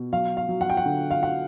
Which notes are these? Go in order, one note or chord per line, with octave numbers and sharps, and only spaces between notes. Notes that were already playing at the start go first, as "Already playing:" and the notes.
Already playing: B2
F#3 F5
F5
F#3
F#5
G5
F#5
D3
F5
F#5